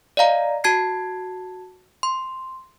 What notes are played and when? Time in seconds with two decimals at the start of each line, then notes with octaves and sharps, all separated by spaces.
0.17 D5 D#5 F5 A#5
0.64 F#4 A5 G#6 C7
2.03 C6